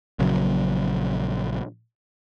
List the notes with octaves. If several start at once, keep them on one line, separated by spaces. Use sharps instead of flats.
A#1 A#2 C#3 F#3